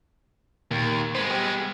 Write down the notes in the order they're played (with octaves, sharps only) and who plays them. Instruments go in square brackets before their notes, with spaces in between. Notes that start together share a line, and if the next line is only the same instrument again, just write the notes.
[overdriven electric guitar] D#2 [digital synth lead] A#2
[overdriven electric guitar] G#3 B3 [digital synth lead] C5
[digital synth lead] G3